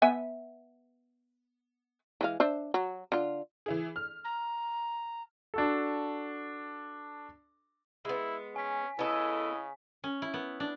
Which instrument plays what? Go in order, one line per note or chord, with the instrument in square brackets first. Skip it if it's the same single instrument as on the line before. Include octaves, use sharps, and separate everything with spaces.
[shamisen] B3 E5 G#5
E3 G#3 F5
D4 C5 E5
F#3
D3 F4
[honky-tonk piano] E3 E4 G#4
F6
[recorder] A#5
[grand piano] D4 F#4 A4
[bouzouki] G#3 B3 [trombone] E4
[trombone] C#4 [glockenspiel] G#5 B6
[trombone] C#3 [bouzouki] B3 A4 [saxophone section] E4 D#5
[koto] C#4
E4
B3
D4